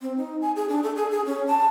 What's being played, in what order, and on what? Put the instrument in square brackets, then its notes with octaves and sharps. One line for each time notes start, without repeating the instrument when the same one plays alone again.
[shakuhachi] C4
D#4
G#5
G#4
D4
A4
G#4
G#4
C#4
A5